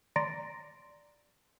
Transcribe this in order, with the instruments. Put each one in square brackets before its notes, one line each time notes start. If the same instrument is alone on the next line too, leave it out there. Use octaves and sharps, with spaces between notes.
[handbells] D5 A#5 C6 A6 A#6 D7